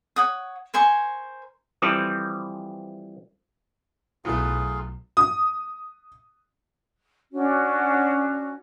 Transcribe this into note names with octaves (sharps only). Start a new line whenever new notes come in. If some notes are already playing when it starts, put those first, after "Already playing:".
C#5 F#5 D#6
A#4 C5 G#5 C#6
E3 F3 G3 C4 A4 B4
B1 A2 F#3 A3 B3 F4 G#4 F5
D#6
C#4 D4 F#4